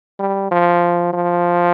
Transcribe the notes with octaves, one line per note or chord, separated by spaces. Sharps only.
G3
F3
F3